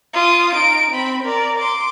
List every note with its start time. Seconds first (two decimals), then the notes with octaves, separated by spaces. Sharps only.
0.14 F4 D#6
0.53 D#4 D7
0.91 C4 B5
1.23 A#4 D5
1.58 C6 D6